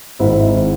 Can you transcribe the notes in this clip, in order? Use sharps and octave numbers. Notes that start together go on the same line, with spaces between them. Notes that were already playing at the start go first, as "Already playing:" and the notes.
G#1 G#2 D#3 E4